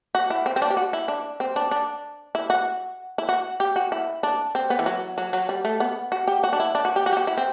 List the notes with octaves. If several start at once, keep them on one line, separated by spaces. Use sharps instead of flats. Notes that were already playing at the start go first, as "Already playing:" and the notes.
F#4
E4
C4
C4
D4
G4
F#4
E4
D4
C4
D4
D4
E4
F#4
E4
F#4
G4
F#4
E4
D4
C4
B3
E3
F#3
F#3
F#3
G3
A3
B3
F#4
G4
F#4
D4
E4
D4
F#4
G4
F#4
G4
F#4
E4
C4